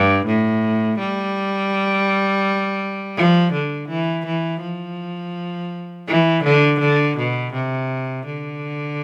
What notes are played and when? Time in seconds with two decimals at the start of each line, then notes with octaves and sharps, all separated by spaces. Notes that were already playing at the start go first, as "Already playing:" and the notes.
Already playing: G2
0.27 A2
0.99 G3
3.17 F3
3.53 D3
3.89 E3
4.26 E3
4.62 F3
6.08 E3
6.44 D3
6.80 D3
7.18 B2
7.54 C3
8.26 D3